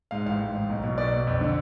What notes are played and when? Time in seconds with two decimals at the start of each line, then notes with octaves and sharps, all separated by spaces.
0.11 G#2 F5
0.26 A1 F5
0.41 G#2
0.55 A1
0.69 B1
0.83 B2
0.98 B1 D5
1.13 B1
1.27 F2
1.41 D3